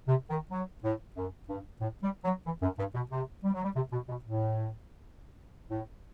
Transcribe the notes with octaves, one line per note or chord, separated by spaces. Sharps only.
C3
D#3
F#3
A2
F#2
G2
A2
G3
F#3
E3
F#2
G2
B2
C3
G3
F#3
G3
C3
B2
B2
A2
A2